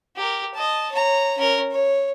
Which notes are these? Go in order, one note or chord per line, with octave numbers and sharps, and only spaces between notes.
G4 A#4
D#5 A5
C#5 A#5
C#4 A#4
C#5